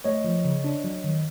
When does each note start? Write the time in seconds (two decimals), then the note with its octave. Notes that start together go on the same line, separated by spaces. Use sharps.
0.04 A3 C#5 D#5
0.24 F3
0.45 C#3
0.64 D4
0.84 F#3
1.04 D#3